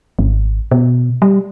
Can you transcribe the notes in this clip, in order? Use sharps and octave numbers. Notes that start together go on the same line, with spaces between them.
G#1
B2
G3